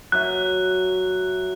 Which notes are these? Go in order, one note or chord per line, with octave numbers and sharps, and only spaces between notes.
F#3 E5 F#6